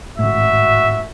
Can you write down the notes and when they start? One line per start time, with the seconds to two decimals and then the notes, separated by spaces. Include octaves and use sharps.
0.19 G#1 A2 F#4 E5